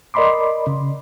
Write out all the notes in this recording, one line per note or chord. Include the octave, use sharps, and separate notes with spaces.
A#4 D5 D#5 B5 C6 D6
C#3